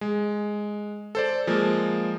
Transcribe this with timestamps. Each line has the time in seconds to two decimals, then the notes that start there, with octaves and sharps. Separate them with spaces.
0.01 G#3
1.15 A4 C5 D5
1.47 F3 G#3 A#3